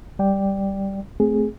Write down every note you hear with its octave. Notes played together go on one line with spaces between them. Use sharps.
G3 D5 G5
A3 C4 G#4